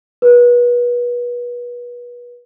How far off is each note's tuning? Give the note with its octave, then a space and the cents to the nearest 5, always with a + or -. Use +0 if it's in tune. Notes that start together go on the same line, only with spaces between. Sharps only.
B4 -30